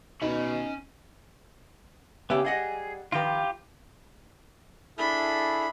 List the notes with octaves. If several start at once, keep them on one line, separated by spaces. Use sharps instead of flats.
B2 C#4 D#4 D#5 B5
C#3 B3 C#4 G4 E5
G3 G#4 D#5 F#5
D#3 F3 F4 G4 B4
D4 E4 G#4 A4 B5